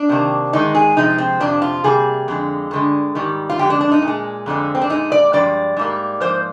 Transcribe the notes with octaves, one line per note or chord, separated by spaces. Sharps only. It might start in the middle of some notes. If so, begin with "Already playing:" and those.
Already playing: D4
C3 D#3 A#3
G#2 D#3 G#3 D#4
G#4
C3 F3 G#3 D#4
C4
F2 C3 F3 D4
F4
C3 G3 A#3 G#4
F2 D3 G#3
G2 D3 G#3
G#2 D#3 G3
F4
F2 D3 G#3 G4
D4
D4
D#4
A#2
G#3
F2 D3 F3 G#3
C4
D4
A#2 G#3 D#4
D5
G2 F3 G#3 D5
G#2 G3 A#3
G#2 F3 A#3 C5